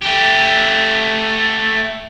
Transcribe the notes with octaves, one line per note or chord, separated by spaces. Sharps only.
A3 G4